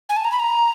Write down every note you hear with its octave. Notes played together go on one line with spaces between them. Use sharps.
G#5
A5
A#5
B5
A#5